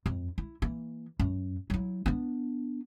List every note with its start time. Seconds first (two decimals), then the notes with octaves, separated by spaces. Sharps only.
0.06 F2
0.38 E4
0.62 E3 A#3
1.19 F#2
1.70 F#3 E4
2.06 B3 D4